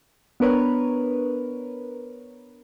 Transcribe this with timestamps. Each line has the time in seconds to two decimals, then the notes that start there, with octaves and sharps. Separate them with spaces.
0.40 B3 D4 A#4 B4 C#5